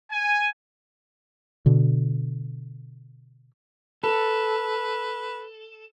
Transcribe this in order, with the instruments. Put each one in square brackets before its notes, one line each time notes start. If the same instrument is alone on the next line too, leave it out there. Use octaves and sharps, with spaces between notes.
[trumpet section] G#5
[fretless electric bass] B2 D3
[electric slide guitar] A4 [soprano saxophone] B4